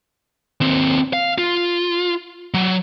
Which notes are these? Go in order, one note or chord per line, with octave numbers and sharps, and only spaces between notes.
D#2 C4
F5
F4
F#3